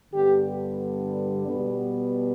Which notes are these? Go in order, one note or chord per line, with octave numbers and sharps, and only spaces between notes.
G2 D3 G3 B3 G4
B2 G3 B3